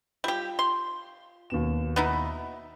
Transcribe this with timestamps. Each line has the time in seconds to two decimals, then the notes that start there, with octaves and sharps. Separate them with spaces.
0.24 G3 F4 G4
0.59 C6
1.50 D#2 B2 E7
1.96 B3 D#4 E4